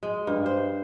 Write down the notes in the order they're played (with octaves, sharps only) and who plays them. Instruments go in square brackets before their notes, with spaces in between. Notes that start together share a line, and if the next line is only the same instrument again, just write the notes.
[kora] G#3
G2
C5